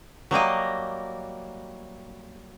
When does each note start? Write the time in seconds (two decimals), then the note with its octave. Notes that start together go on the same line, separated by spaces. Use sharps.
0.31 F#3 G3 A#3 D#5